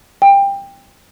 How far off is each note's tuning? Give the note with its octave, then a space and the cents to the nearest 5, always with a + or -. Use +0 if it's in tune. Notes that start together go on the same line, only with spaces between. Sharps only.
G5 +20